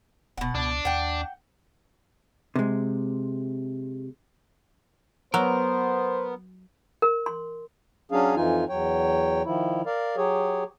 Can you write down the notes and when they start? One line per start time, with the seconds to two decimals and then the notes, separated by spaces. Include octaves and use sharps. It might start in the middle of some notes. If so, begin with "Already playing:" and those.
0.37 E1 B2 F#5
0.55 C#2 D4
0.85 D#2 F#5 G5
2.56 C3 G#3
5.34 F#3 B3 A#4 C5
7.02 A#4
7.26 C6
8.12 F#3 C#4 D4 G#4 F5
8.36 F2 E3 D#4 F4 G#5
8.69 E2 F#3 C#5 G5
9.45 D#3 F3 E4
9.86 A#4 D5 F5
10.17 F#3 G4 G#4 C#5